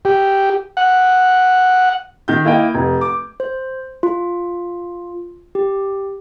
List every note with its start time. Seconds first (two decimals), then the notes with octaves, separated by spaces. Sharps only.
0.05 G4
0.77 F#5
2.28 D#3 G6
2.45 A#3 E4 A#4 D#5 G5
2.74 F1
3.01 D6
3.40 C5
4.03 F4
5.55 G4